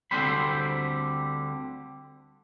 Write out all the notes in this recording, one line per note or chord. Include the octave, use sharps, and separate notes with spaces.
D2 D3 G3 C4 C5 B5